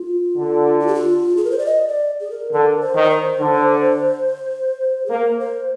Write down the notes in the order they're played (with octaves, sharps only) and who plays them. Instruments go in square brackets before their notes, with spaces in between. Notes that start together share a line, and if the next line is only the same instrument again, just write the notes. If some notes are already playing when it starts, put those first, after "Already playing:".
Already playing: [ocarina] F4
[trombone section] D3
[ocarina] F4
G4
F4
G#4
A#4
C5
D5
D#5
D5
G#4
A#4
[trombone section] D3 [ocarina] A#4
[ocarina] C5
[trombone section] D#3
[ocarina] D5
C5
[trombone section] D3
[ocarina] G#4
[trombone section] A#3 [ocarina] A#4
[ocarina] C5